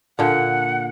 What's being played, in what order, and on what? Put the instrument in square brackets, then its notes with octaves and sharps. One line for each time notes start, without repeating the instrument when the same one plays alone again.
[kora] A#2 D3 [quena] F#5